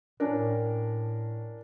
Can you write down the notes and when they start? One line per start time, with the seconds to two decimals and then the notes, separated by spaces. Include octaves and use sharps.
0.20 A2 C#4 D4 A#4